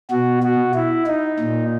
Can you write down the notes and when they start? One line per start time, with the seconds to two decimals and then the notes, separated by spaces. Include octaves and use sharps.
0.10 B2 F#4
0.43 F#4
0.75 E4
1.07 D#4
1.39 A#2